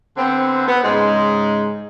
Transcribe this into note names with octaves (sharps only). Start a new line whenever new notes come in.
D3 B3 C4
B3
G#2 C#3 G#3